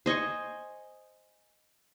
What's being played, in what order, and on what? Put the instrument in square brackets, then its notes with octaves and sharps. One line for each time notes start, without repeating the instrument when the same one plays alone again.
[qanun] C5 D#5 G#5 C#6